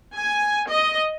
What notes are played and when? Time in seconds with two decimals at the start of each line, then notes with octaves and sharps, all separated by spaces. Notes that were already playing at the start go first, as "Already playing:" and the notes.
0.15 G#5
0.68 D#5